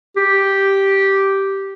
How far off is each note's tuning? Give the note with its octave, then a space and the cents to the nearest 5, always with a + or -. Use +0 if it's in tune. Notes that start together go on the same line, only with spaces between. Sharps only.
G4 -5